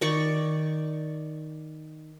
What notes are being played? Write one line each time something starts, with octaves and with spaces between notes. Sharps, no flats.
D#3 D5 C#6